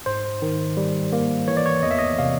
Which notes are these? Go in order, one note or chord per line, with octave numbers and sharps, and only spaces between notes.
G#2 C5
D#3
G3
A#3
E3 C#5
D5
C#5
E2 D#5
E5
D#5
C3 F5